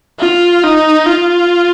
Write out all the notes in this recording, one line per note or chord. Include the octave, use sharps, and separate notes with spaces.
F4
D#4
F4